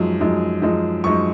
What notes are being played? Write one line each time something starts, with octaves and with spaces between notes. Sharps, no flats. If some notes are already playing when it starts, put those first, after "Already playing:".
Already playing: F#2 F3 G#3 D#4
F#2 F3 G#3 D#4
F#2 F3 G#3 D#4
F#2 F3 G#3 D#4 C#6